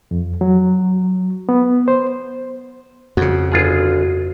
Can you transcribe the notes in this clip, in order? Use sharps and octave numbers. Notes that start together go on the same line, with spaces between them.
F2
F#3
B3
C5
F2 C#3 F#4
G1 F4 G#4